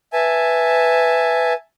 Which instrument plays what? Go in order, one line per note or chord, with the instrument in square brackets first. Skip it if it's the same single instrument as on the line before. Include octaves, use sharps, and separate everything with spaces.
[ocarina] B4 [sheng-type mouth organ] E5 G#5 A5